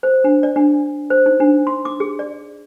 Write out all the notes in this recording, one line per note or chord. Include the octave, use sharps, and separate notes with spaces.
C5
D4
D5
D4
C5
D#4
D4
C6
D6
G#4
D5